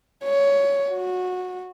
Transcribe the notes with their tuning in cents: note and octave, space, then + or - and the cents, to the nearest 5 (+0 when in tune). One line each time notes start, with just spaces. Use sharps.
C#5 +15
F#4 -20